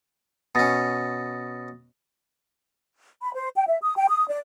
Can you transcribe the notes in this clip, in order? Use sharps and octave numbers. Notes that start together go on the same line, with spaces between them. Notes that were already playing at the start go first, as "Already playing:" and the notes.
B2 C#4 D#6 A6 A#6
B5
C5
G5
E5
D#6
G5
D#6
D5